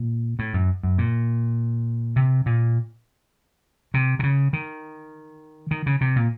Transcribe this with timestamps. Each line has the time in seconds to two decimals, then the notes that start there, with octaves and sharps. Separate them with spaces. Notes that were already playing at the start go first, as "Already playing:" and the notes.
Already playing: A#2
0.39 A2
0.54 F#2
0.83 F#2
0.98 A#2
2.16 C3
2.46 A#2
3.94 C3
4.19 C3
4.23 C#3
4.53 D#3
5.71 D#3
5.86 C#3
6.01 C3
6.16 A#2